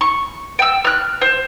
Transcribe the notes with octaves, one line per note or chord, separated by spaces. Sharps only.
C#6
G5 E6
F6 F#6
C5